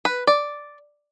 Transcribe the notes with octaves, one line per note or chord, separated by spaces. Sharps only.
B4
D5